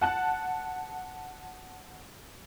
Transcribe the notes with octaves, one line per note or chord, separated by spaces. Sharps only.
F#5 A5 F#6